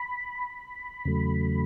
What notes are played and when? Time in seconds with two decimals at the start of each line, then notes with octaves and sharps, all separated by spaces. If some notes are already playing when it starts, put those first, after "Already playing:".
Already playing: B5
1.05 E2 C#3 F#3 A3